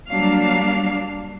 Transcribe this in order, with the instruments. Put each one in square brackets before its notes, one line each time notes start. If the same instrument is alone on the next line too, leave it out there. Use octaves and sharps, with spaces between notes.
[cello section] F#3 G3 A#3 D4 F5